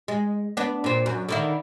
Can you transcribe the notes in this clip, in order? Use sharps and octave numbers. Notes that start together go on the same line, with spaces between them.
G#3
B3 D4
A#2 C4
F#2
D3 D#3 E4